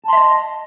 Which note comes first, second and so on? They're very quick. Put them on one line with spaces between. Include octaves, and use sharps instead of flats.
A5 C6 E5 D#5